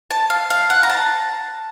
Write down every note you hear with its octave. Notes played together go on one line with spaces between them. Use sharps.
A5
F5
F5
F#5
A#5
A5